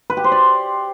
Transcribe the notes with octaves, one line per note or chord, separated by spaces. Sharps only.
B4
G4
C5
D5